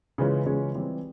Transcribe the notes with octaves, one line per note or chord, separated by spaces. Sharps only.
C#3 E3 G#3 C#4 F4
C#3 E3 G#3 C#4 F4
E3 G3 C4